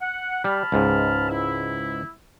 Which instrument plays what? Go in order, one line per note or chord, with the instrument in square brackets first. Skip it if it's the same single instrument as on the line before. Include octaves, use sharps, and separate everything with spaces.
[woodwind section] F#5
[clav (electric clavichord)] G3 [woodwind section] A5 B5 F6
[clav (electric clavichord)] C#2 G#2
[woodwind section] E4